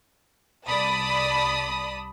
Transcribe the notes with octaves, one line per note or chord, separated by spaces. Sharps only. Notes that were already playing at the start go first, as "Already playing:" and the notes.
C2 D5 A5 B5 D#6